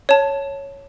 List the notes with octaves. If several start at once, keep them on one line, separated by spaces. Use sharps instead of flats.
C#5 A5